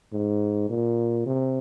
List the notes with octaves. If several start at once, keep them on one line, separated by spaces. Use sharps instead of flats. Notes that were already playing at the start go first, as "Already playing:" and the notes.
G#2
A#2
C3